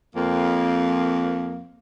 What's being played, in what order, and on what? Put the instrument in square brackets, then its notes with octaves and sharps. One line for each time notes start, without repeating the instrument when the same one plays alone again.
[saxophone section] F2 A#3